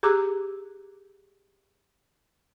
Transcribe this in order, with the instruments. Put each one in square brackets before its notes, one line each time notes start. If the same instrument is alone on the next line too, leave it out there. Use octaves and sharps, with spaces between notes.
[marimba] G4 G#4 A#5 D6 E6 F#6